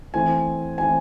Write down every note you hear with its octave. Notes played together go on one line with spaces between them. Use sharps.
E3 A3 C4 G#5
E3 A3 C4 G#5